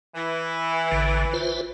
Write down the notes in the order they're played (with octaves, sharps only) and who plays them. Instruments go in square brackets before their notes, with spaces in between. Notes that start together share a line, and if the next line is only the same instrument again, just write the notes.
[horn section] E3
[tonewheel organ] A1 D3
F4 B4 C5